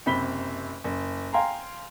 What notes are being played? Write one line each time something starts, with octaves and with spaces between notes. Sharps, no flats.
F#1 C3 B5 B6 G7
F#1
F5 G5 G#5 A#5 C6